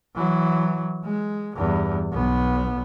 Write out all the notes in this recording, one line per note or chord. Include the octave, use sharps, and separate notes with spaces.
E3 F#3
G#3
E2 G2
B1 B3